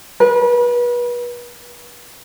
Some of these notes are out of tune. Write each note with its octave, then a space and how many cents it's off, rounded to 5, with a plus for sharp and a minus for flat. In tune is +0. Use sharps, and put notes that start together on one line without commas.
B4 -35